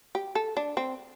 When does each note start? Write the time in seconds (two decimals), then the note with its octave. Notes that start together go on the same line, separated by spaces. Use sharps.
0.15 G4
0.35 A4
0.57 D4
0.77 C4